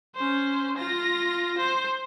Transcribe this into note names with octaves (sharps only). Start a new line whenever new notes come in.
C#4 C5
F4 A#6
C5